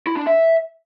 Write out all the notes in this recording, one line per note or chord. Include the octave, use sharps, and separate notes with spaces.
E4
D4
E5